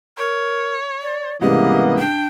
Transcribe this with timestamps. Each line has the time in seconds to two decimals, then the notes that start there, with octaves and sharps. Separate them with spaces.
0.18 A#4 C#5
1.02 D5
1.41 C2 G#2 C#3 E3 A#3 B3 G4 D#5
1.98 D4 G5